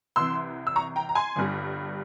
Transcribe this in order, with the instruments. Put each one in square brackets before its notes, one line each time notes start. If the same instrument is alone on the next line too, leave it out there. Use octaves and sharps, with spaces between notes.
[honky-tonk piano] C2 C3 E3 C6 E6
E6
A#5 C#6
G5 A#5
A#5
G#5 C6
G1 G2 G3